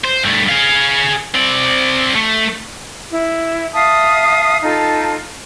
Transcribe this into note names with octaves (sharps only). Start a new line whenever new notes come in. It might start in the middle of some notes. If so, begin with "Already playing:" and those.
C5
G2 A3
G#4 F5
C4 D5
A3
E4
E5 F5 A5 D#6
D#4 F4 A4 A5